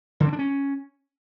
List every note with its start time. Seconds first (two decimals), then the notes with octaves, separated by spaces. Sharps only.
0.20 D3
0.26 C4
0.33 D4
0.39 C#4